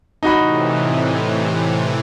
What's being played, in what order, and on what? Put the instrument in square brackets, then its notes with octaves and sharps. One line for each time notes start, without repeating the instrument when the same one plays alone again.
[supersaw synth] A2 C3 E3 [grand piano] D#4 F#4 B5